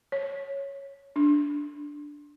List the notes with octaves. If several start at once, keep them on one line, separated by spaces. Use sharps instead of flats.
C#5
D4